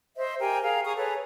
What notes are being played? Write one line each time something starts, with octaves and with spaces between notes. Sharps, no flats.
C5 D#5 E5
G4 A#4 G5 G#5
G#4 A#4 F5
G#4 A#5 C#6 D#6
G#4 A4 B4 C#5